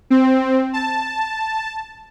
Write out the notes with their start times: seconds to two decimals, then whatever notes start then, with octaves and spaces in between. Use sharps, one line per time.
0.10 C4
0.73 A5